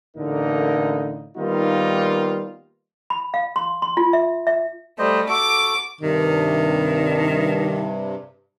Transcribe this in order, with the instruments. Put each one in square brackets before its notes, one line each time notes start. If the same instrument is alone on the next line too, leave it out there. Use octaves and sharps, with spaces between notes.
[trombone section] A1 A2 D3 A#3 D#4 A#4
D#3 G3 A#3 B3 D#4 F4
[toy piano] B5
F5
C6
C6
F4
E5
E5
[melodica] G3 C5 D#5 [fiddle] A3
[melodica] F#4 A4 [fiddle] D6
[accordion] G2 C3 [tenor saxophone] D#3